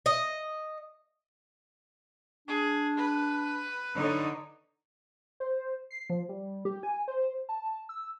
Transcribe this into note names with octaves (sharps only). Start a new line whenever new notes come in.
D#5
D4 G#4
B4
D3 D#4 C#5
C5
C7
F3
G3
G4
G#5
C5
A5
E6